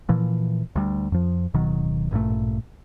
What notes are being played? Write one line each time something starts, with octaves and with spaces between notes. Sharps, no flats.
A#2 E3 F3
D2 G3
F2 F3
D1 B2 D#3 F#3
A1 G2 A#2 A3